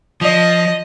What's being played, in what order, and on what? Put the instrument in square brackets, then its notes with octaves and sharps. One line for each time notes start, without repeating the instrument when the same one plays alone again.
[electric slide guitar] F3 [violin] D#5